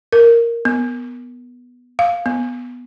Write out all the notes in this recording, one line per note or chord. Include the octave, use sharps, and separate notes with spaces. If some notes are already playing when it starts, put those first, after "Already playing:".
A#4
B3
F5
B3